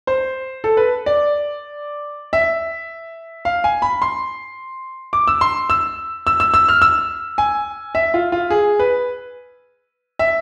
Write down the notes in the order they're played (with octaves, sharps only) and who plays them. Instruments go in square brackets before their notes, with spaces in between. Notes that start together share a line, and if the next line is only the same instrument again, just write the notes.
[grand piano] C5
A4
B4
D5
E5
F5
G#5
B5
C6
D6
E6
C6
E6
E6
E6
E6
F6
E6
G#5
E5
F4
F4
G#4
B4
E5